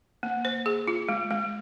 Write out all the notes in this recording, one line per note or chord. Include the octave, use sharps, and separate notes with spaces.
A#3
C5
G#4
F4
G#3
G#3